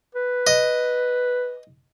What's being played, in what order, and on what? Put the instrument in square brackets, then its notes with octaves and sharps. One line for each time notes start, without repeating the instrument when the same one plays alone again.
[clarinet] B4
[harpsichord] D#5